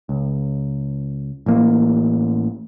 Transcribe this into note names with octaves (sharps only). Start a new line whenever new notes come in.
C#2
A1 E3 A#3